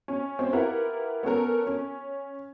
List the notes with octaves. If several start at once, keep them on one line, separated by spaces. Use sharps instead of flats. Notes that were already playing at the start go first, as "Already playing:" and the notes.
C#4
C4 C#4
E4 F4 G4 A#4 B4 F#5
B3 C#4 A4 A#4
C#4